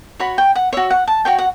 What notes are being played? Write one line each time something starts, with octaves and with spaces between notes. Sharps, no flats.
F#4 C#5 B5
G5
F#5
F#4 C#5 E5
F#5
A5
F#4 C#5 G5
F#5